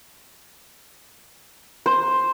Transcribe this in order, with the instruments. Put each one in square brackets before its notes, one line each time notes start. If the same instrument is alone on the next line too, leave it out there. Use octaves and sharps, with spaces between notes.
[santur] C5